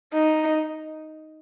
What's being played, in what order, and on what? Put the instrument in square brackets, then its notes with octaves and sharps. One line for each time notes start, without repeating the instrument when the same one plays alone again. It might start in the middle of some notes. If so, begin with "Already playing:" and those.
[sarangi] D#4